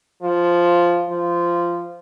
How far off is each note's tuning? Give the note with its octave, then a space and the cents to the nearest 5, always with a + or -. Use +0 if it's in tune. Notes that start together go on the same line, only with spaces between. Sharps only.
F3 -5
F3 -15